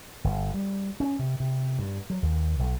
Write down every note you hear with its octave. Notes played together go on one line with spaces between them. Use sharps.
G1
G3
C#4
C3
C3
G2
F#3
D#2
B1